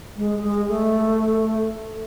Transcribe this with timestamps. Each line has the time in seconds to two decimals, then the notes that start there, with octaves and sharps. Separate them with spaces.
0.17 G#3
0.43 G#3
0.69 A3